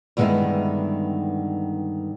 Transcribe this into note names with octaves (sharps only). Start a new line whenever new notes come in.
G2 D3 D#3 G#3 B3 E4